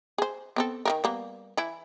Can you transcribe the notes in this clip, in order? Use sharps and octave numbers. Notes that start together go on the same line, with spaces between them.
G#4 C5
B3 C4 A4
D#3 A3 A#4
G3 A#3 B3
E3 E4